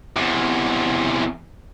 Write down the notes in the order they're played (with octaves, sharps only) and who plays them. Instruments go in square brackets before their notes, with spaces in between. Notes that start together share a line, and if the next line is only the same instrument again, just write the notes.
[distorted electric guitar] E2 C3